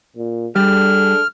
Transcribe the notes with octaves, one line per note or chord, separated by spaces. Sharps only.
A#2
G3 D4 G#4 A4 F6